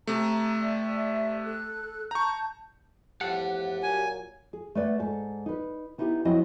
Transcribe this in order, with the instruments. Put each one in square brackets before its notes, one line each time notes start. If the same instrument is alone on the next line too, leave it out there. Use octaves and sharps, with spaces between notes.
[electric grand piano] C3 A3 [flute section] A#5
[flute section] D5 E5
A4 F#6
[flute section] A5 G6 [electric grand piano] A#5 C#6
[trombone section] E2 A2 F3 [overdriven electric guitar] G4 A5 [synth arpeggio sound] F#5
[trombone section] A#2 F#3 [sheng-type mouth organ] G#5
[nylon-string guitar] G#4
A3 B4 D5 F#5
G#2 A4
D#4 B4
B3 D#4 E4 F#4 G4
F3 F#3 C4 E4 D#5